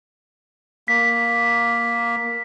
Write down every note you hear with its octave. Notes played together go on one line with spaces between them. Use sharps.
A#3 B6